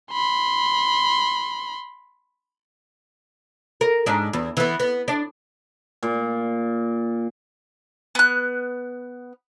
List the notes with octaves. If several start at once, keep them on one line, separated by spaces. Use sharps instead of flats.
B5 C6
A#4
G#2 D4
E2
E3 B3
B3
D4
A#2
B3 F#6